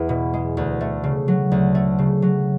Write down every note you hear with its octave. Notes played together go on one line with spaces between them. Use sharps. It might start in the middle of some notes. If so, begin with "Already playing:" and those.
Already playing: E2 G#3 B3
B2
G#3
D2
A3
C#3
F#3
D2
A3
C#3
F#3